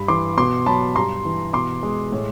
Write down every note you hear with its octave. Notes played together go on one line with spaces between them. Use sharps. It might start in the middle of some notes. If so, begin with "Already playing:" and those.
Already playing: G2 B5
E3 C6 D6
B2 C6 D6
F#3 A5 B5
G2 A#5 C6
E3
B2 C6 D6
G#3
A2